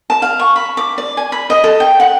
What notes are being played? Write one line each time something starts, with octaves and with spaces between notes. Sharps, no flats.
A5
F5
C#6
B5
D6
D5
G#5
B5
D#5
A4
G5
F#5